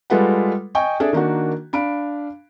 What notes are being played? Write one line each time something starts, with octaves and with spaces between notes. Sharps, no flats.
G3 G#3 F4 A4 B4 F#5
D#5 G5 G#5 C#6
D4 G#4 A4 D5 E5
D#3 A#3 D4 F#4
D4 F5 B5 D7